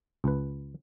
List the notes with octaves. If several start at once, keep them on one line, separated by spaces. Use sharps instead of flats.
C#2 B4